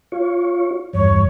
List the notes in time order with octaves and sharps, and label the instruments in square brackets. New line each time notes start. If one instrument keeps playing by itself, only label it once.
[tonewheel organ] F4 C#5
[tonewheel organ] E2 G2 [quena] C#5